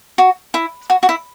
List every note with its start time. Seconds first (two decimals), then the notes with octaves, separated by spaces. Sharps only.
0.18 F#4
0.54 E4
0.90 F#4
1.03 F#4
1.09 E4